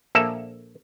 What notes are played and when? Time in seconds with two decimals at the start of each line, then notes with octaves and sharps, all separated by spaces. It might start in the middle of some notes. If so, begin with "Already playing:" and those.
0.15 A#1 A#3 A4 E5